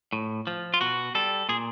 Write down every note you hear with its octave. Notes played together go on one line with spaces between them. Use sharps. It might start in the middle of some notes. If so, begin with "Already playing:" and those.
A2
F3
F4
B2 F#4
G3 A4
A#2 G#4